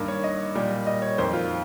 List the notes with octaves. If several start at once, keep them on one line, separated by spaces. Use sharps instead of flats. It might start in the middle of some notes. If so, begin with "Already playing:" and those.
Already playing: G2 D#3 A#3 A#4
C#5
D#5
A#2 G3 A#3
D#5
C#5
F2 D#3 A#3 C5
F4